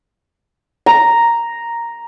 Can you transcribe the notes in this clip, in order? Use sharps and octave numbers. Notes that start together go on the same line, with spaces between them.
A#5